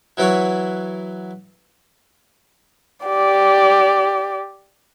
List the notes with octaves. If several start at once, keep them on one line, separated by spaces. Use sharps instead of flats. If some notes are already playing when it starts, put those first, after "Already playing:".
E3 F#3 E4 F#4 C#5
G4 D5